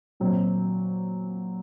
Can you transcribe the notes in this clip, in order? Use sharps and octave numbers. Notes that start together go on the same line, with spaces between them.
A#2 F#3 C4